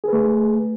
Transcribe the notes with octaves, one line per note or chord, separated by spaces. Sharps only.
A3 G#4 B4